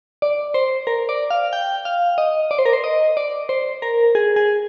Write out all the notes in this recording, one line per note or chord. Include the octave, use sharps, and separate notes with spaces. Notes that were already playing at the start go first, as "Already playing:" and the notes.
D5
C5
A#4
D5
F5
G5
F5
D#5
D5
C5
A#4
C5
D#5
D5
C5
A#4
G#4
G#4